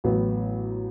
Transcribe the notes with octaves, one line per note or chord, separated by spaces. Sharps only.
A1 A2 F#3 B3